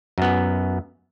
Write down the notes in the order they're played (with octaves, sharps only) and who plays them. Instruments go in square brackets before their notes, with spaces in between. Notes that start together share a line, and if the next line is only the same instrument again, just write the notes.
[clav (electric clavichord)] F#2 B3